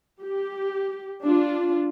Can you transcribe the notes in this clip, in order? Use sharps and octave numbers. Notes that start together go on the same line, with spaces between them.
G4
D4 F4